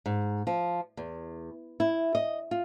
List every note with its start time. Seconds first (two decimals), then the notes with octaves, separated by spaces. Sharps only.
0.06 G#2
0.47 F3
0.97 E2
1.80 E4
2.15 D#5
2.51 F4